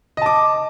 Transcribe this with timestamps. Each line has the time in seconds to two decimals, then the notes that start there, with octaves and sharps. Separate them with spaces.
0.17 D#5
0.22 A5
0.26 D6